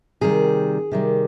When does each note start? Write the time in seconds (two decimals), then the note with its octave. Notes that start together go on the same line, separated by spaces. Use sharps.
0.21 C3 D#3 G3 G#4
0.91 C3 D#3 G3